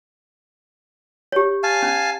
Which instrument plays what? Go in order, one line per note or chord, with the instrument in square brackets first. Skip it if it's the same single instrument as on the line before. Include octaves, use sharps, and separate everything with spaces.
[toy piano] G4 C#5
[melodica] F5 G#5 A5
[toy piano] C#4